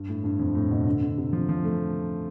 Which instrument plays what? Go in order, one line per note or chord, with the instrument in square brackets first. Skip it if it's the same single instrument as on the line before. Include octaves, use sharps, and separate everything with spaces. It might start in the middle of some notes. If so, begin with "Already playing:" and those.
Already playing: [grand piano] G2
A2
G2
F2
A2
B2
D3
D3
C3
F3
F3
A3